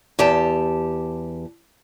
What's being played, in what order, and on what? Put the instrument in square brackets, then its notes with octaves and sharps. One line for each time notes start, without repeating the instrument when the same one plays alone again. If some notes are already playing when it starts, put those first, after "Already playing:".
[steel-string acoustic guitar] E2 G4 A5